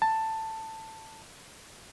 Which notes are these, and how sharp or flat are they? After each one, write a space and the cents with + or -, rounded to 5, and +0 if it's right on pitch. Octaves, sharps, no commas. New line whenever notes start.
A5 +10